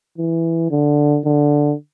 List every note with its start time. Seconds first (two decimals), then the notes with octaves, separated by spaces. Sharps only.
0.18 E3
0.71 D3
1.25 D3